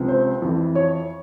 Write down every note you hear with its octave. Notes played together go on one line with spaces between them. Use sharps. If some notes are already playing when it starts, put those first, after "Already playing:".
Already playing: C#2 C3 F3
C5
F2 E3
C#5